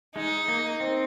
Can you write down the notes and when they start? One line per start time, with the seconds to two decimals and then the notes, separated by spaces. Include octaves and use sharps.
0.15 G#3 D#4
0.48 A#3
0.80 C4